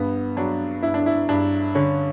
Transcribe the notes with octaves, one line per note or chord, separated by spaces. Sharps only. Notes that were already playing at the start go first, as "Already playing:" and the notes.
Already playing: G2 B3
F#3 D4
G2 E4
D4
E4
G2 D4
D3 C#4